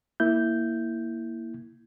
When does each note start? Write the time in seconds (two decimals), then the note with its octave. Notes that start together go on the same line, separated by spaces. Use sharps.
0.20 A#3 E4 G6